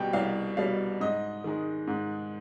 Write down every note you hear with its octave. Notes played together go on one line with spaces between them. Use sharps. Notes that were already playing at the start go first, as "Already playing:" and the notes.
Already playing: C2 B2 G3 G5
C2 F5
B2 G3 F5
G#2 D#5
D#3 G#3
G#2